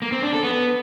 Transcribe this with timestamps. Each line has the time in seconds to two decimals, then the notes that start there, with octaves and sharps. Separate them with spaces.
0.02 A#3
0.12 C4
0.22 D4
0.33 A4
0.43 B3